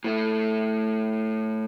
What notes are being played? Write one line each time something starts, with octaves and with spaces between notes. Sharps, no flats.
A2 A3